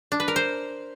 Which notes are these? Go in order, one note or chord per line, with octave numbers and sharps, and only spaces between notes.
D4
B4
A#4
C5